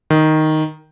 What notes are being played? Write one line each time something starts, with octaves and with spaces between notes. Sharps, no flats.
D#3